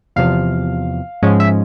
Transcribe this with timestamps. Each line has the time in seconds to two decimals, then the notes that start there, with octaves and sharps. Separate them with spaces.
0.16 E2 C3 F3 F5
1.22 G#2 F3 G#3 C#4
1.40 E5